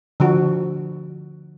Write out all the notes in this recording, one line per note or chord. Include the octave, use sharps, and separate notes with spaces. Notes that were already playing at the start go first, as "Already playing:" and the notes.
D3 F3 F#4